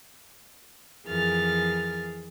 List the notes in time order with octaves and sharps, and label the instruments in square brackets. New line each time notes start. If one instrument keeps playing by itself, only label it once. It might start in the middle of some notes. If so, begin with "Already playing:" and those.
[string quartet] F2 E3 G#4 A#4 F6 A6